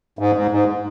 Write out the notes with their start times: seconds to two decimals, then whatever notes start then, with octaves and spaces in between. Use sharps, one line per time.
0.19 G#2
0.35 G#2
0.51 G#2